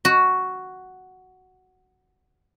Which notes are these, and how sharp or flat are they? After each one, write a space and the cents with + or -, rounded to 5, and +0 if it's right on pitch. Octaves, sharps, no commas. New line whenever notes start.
F#4 +5